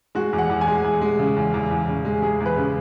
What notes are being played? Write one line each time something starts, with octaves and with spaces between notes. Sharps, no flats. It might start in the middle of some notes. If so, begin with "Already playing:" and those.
G#3 F#4
E2
F#5
E2
G#5
G#3
E2
G#3
C#3
E2
E2
E2
C#3
G#3
G#3 G#4
E2
B4
C#3